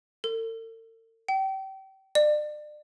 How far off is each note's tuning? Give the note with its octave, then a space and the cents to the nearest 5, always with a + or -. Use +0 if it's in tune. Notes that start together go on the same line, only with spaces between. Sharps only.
A4 +45
G5 -30
D5 +35